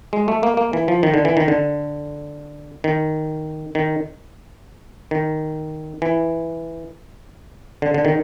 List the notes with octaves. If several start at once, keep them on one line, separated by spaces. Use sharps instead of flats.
G#3
A3
A#3
A#3
E3
F3
D#3
D3
E3
D#3
D3
D#3
D#3
D#3
E3
D3
D3
D#3